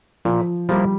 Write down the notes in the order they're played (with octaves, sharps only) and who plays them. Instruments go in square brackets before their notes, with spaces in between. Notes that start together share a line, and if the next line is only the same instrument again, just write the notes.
[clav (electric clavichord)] A#2 [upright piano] F3
[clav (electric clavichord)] F3 A#3 E4 [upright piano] G3